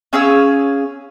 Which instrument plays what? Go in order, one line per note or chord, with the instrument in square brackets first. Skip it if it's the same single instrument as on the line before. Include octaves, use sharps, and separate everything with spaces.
[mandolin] C#4 G#4 F5 E6